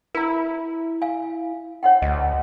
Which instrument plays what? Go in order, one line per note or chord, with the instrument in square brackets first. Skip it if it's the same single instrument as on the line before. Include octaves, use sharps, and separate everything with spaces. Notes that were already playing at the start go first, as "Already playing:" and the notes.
[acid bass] E4 [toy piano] B4 A#5
[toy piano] F5 G#5
C#5 F#5 G5
[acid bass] D2 [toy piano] D#5